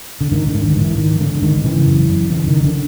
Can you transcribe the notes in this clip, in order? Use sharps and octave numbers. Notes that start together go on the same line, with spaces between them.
D3
G#2 D#3
D3
G#2
D#3
G#2
E3
G#2 D#3
G#2 D3
G#2 D#3
C#3 E3
F#2
F#2
C#3 E3
D#3
C#3
D3